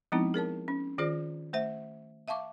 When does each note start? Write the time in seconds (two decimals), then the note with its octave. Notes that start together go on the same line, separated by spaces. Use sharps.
0.12 F3 G#3 B3 C4 D#4 E4
0.34 G#4 A#4 C#5 A5
0.68 C#4
0.98 D#3 F4 G#4 C5 D5
1.53 A3 C5 E5
2.28 E5 F5 A5 C#6 D6